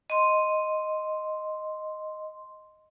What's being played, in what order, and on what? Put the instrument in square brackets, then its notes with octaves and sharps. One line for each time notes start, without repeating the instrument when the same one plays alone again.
[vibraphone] D#5 C6